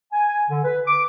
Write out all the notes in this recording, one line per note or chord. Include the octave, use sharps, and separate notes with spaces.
G#5
D3
B4
D6